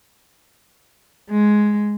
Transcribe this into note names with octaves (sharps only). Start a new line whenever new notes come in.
G#3